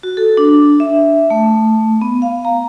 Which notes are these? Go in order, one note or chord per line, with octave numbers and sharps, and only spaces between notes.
F#4
A4
D4
E5
A3
B3
F5
A#5